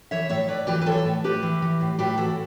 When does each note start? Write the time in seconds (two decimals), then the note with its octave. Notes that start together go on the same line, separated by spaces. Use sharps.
0.11 E3 C#5 E5
0.29 A2 C#5 E5
0.48 A2 B4 D5
0.67 E3 G4 B4
0.81 B4
0.86 E3 A4 C#5
1.05 A2
1.24 A2 G4 B4
1.43 E3
1.62 E3
1.81 A2
1.99 A2 G4 B4
2.17 E3 F#4 A4